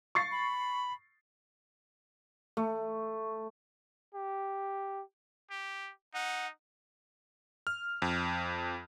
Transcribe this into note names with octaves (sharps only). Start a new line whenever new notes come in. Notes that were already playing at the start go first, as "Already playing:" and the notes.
C#6 A6 C7
B5
A3
G4
G4
D#4 F#5
F6
F2